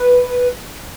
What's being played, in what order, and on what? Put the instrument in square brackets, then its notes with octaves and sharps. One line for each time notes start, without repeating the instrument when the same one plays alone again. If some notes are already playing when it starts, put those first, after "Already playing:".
Already playing: [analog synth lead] B4